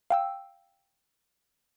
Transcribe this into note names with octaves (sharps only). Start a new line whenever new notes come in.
F5 G5 E6